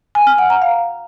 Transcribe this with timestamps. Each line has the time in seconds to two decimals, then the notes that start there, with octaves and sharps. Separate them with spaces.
0.15 G#5
0.27 F6
0.38 F#5
0.50 A#5
0.62 F5